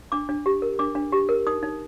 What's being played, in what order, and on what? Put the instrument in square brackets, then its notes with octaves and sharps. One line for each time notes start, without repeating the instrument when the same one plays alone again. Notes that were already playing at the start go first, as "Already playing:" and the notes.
[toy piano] D4 D6
D4
G4
A#4
D4 D6
D4
G4
A#4
D#4 D#6
D#4